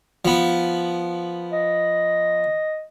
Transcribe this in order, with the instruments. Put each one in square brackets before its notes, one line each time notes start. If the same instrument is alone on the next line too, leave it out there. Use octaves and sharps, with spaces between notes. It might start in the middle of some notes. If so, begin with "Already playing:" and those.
[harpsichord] F3 B3
[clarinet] D#5